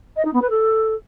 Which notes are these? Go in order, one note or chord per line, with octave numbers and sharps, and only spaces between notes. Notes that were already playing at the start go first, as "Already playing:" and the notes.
D#5
D#4
B3
B4
A4